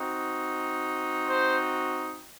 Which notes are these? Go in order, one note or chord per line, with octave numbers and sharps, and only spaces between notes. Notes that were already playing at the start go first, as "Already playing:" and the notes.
Already playing: C4 D#4 F#4
C5